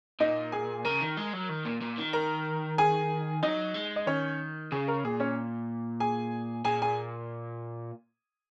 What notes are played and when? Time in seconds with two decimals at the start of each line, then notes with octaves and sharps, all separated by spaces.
0.20 A#2 D#4 D#5
0.52 G#4 G#5
0.85 C#3 A#4 A#5
1.01 D#3
1.17 G#3
1.33 F#3
1.49 D#3
1.65 A#2
1.82 A#2
1.98 D#3
2.13 A#4 A#5
2.78 G#4 G#5
3.43 F#3 D#4 D#5
3.75 G#3
3.96 D#5
4.07 D#3 C#4 C#5
4.72 C#3 G#4
4.88 A#4
5.04 A#2 G#4
5.20 C#4 C#5
6.00 G#4 G#5
6.65 A#2 G#4 G#5
6.82 G#4 G#5